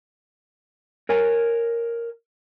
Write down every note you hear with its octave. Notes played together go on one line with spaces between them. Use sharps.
A#4 C#5 G#5